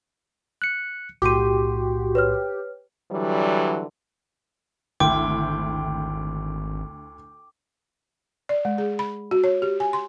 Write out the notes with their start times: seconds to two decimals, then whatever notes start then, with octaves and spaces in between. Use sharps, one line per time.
0.62 F#6 C#7
1.22 B1 A2 F#4 G4 C6 D6 D#7
2.15 B4 C#5 F6
3.11 D3 E3 F#3 G3
5.00 G#1 D2 E4 G5 D6
8.49 D5
8.65 G#3
8.78 G#4
8.99 B5
9.31 F#4
9.44 C#5
9.62 G4
9.80 G#5
9.93 C6